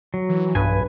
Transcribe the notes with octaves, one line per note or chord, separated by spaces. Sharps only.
F#3
E3
B1 G2 B4 G#5